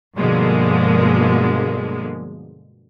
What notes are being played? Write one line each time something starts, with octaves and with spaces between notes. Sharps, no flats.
G2 B2 D3 F3 G#3 A#3